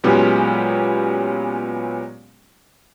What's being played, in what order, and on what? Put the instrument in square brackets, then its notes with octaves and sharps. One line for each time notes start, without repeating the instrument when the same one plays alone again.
[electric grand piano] A#2 F#3 G#3 B3 C#4 G4